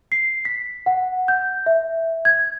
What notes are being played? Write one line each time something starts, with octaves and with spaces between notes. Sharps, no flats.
C7
B6
F#5
G6
E5
G#6